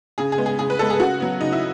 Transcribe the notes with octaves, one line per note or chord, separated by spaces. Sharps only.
C#3 G#4
G#4
G#3 B3
G#4
C#3 G#4
B4
G#3 B3 A4
G#4
C#3 F#4
F#3 B3
C#3 D#4
E4